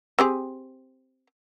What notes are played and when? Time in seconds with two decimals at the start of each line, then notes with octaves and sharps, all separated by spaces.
0.19 C4 G4 G#4